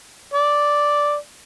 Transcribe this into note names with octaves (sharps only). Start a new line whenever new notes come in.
D5